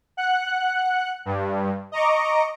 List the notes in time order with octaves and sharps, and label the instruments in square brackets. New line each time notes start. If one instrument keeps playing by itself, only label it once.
[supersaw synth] F#5 F#6
G2
D#5 A#5 C#6 D6